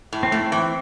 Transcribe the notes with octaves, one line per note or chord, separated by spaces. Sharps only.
A2
C4
A2 A3
C4
E3